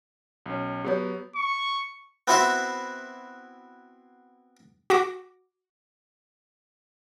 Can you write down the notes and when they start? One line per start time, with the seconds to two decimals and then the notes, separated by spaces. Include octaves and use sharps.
0.46 B1 C#4
0.84 F#3 B3 G4 C#5
1.36 C#6
2.27 B3 C4 E4 F#4 C5 E5
4.90 F#4 D6 A#6